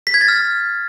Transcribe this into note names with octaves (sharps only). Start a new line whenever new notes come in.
B6
G#6
A6
F6